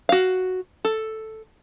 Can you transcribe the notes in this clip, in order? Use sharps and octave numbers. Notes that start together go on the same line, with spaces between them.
F#4 F5
A4